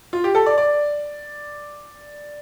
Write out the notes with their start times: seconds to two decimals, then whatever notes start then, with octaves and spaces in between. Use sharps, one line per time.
0.13 F4
0.24 G4
0.35 A4
0.46 D5
0.58 D5